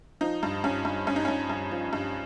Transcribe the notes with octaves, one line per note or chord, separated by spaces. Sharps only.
F3 D#4
G2
G2 C#4
G2
G2 C#4
D#4
G2 C#4
G2
F3
G2